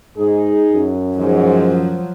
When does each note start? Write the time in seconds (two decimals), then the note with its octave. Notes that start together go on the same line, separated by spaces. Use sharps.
0.17 G#2 D#4 G#4
0.72 F#2
1.16 G#2 F3 F#3